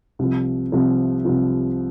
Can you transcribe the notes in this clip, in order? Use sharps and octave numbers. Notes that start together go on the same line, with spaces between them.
C2 C3 F3
C2 C3 F3
C2 C3 F3